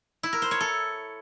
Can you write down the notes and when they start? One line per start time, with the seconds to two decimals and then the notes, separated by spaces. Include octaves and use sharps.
0.23 E4
0.33 A#4
0.42 C5
0.51 C#5
0.60 A4